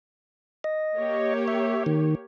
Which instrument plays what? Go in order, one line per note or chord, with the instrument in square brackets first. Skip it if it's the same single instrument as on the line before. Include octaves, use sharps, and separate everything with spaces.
[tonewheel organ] D#5
[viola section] A#3 G4 C#5
[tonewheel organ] E5
D#3